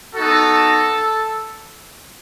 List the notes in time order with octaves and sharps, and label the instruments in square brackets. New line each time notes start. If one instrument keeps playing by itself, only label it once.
[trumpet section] B3 D#4 F#4 A4